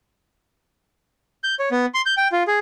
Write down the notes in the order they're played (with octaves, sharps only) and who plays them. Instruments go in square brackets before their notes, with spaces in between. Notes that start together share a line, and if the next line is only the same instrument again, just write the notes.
[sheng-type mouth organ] G6
C#5
B3
C6
G6
G5
F4
G#4